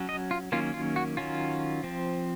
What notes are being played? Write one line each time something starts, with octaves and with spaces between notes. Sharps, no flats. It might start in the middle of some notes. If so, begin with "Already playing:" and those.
Already playing: F#3 C#4
D#5
F4
D#3 F#3 A#3 C#4 F4
F4
F#4
D#3 F#3 C#4 F4
F3 C4